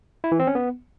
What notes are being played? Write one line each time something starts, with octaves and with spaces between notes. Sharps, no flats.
E4
E3
C4
C#4
B3